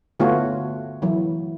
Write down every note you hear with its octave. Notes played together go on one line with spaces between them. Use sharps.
D3 A3 B3 F4 F#4 C#5
E3 F#3 E4